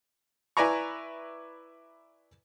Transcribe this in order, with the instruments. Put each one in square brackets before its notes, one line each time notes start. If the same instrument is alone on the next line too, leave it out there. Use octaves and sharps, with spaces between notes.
[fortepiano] E4 B4 D5 G#5 A#5 C#6